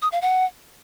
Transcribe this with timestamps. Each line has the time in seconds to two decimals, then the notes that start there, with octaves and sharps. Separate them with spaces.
0.02 D#6
0.12 F5
0.22 F#5